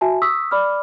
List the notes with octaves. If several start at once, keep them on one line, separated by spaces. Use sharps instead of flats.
F#4 E5 G#5 A5
C#6 D#6 E6 B6
D5 B5 D6 F6